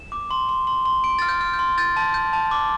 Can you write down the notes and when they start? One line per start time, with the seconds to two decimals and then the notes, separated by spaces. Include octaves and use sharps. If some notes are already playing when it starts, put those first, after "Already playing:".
Already playing: E7
0.12 D6
0.31 C6
0.49 C6
0.67 C6
0.85 C6
1.04 C6 D7
1.19 F6 A6
1.29 G6
1.41 F6
1.53 G6
1.59 C6
1.78 G6 A6
1.97 A5
2.14 G6
2.33 A5
2.51 D6